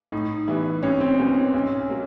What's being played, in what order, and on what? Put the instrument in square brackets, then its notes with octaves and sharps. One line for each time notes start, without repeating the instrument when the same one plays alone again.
[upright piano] A2 [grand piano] D#4
[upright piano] E3 G3 B3 E4
[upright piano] C2 [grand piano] C#4
[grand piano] C4
[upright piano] A#2 F#3 B3 D#4 [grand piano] C#4
[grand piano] C#4
[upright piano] B1 [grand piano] C#4
[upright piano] F#3 A#3